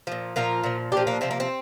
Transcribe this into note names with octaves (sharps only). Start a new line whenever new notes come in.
A#2 F3
A#2 F3 F4 A#4
A#2 F3
A#2 F3 D4 G4
A#3 D4
C3 F3 C4
A#3
C4